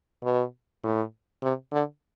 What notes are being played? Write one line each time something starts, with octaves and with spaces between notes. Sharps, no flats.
B2
A2
C3
D3